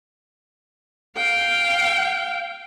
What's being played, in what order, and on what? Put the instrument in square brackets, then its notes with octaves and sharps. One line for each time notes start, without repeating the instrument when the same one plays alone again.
[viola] F5 G5